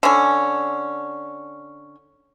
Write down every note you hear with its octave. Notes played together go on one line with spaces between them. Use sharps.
D3 C#4